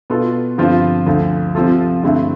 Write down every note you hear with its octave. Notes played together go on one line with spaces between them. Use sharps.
B2 B3 F4 A4
G2 D3 F3 C4 F4
D2 D3 F3
C3 F3 C4 F4 A4
G2 D3 A3 C4 E4